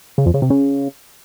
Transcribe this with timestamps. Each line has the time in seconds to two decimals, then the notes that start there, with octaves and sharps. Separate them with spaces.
0.18 C#3
0.26 F2
0.34 C#3
0.42 C3
0.50 C#3